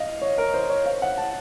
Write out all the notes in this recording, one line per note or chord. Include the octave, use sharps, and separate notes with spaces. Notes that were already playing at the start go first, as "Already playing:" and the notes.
Already playing: D#5 F5
C#5
A#4
C5
C#5
F5
F#5
A5